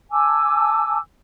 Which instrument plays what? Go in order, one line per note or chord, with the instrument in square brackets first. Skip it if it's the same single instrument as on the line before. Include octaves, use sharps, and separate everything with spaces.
[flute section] G#5 A5 D6 E6